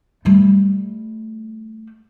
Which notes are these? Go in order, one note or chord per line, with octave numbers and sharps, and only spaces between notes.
G3 A3